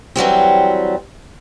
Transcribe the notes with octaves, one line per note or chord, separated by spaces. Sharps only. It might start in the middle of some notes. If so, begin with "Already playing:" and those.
E3 F#3 G3 C4